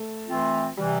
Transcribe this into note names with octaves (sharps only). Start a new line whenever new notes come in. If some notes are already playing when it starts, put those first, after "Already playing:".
Already playing: A3
E3 A3 C4 F4
C3 E3 G3